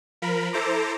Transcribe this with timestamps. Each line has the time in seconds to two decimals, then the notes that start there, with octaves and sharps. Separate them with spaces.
0.22 F3 A#4 B5
0.53 E4 A4 C5 A#5 D6